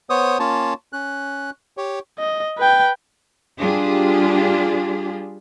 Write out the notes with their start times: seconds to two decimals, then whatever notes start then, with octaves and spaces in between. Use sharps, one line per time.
0.10 B3 C5 C#5 D#6
0.39 A#3 C#4 F4 C#5 A5
0.93 C#4 F#6
1.77 G4 C#5
2.19 D#5
2.58 B4 G5
3.59 G3 D4 F4 G4 G#4